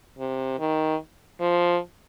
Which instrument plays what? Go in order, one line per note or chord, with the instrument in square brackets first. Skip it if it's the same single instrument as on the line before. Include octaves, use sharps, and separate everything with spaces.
[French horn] C3
D#3
F3